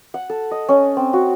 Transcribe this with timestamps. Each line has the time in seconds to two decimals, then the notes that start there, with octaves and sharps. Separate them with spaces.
0.14 F#5
0.30 A4
0.51 D#5
0.69 C#4
0.97 C4
1.13 F#4